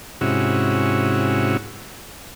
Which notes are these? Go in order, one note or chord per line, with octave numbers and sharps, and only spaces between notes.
G#2 C3 C#4 E4 F#4